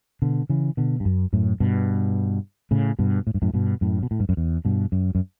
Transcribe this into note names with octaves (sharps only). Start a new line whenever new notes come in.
B2 D3
C#3 E3
B2 D3
G2
F#2
F#2 A2
G2 B2
A2 C#3
G2 B2
A2
G2
F#2 A2
G2 B2
F#2 A2
B2
A2
G2
F#2
E2
G2 B2
F#2
F#2